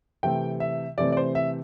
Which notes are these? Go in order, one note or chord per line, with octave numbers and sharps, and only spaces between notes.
C3 E3 A3 C4 G5
E5
C3 E3 A3 C4 D5
D5
C5
E5